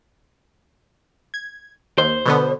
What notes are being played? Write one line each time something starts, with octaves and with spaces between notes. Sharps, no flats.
G#6
D#2 C5
B2 D3 B3